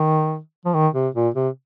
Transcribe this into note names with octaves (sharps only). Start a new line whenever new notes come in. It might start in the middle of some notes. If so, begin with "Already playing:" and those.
Already playing: D#3
F3
D#3
C3
A#2
C3